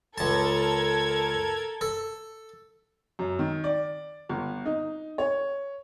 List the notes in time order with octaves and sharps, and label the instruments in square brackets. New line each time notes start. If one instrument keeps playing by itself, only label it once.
[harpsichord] C#2 A5 [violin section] A4 A#4 G#6
[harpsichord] A4
[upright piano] F#2
D#3
D5
G1
D#4
C#5